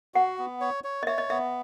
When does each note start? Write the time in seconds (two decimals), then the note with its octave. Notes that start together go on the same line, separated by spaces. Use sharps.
0.14 F#4 F#5
0.39 B3
0.61 C#5
0.84 C#5
1.03 D#5
1.07 C#5 E5
1.18 D#5
1.30 B3 E5